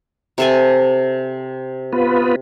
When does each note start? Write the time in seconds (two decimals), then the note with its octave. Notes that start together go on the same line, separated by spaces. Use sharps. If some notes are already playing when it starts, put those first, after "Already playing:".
0.38 C3 A4 G#5
1.92 B3 F4 B4